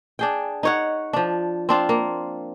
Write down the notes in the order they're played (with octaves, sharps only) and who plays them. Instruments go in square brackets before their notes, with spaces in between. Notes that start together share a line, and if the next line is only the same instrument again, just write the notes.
[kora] D4 G#4 G5
D#4 C#5 F#5
F3 D4
C4 D4 F4
A#3